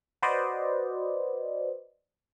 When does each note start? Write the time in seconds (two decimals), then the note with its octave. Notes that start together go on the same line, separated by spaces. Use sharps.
0.22 F#4 B4 C5 D5 D#5